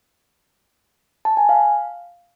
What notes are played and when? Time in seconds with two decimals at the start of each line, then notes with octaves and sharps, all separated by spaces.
1.25 A5
1.37 G#5
1.49 F5